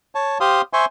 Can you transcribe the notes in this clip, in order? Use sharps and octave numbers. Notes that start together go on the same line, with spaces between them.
C#5 A5
G4 C5 F5 C6 D#6
C5 E5 G#5 C6 C#6